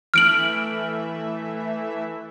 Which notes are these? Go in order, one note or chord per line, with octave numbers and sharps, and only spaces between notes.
E3 A3 E5 F6 D7 F#7